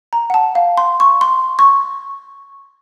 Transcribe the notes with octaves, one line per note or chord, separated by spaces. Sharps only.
A#5
F#5
A5
F5
C6
C#6
C6
C#6